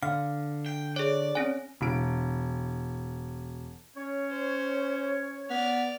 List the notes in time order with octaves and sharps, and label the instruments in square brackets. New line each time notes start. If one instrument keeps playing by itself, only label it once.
[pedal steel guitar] D3 [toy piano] F5 [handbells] F6
[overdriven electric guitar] G5
[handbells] G#4 C#5 [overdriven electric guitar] D5
[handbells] C4 C#4 C#5 [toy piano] G#5
[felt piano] E1 D7
[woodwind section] C#4 C#5
[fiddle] C5
[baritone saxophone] B3 [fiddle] D5 F6